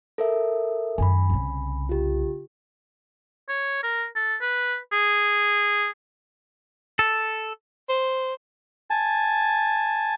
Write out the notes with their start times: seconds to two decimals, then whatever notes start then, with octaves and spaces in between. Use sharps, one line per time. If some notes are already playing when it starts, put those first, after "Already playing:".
0.18 A4 A#4 E5
0.98 F#2 D#3 G#5 B5
1.30 C2 C#3
1.89 F4 G4
3.49 C#5
3.83 A#4
4.16 A4
4.41 B4
4.92 G#4
6.99 A4
7.89 C5
8.90 G#5 A5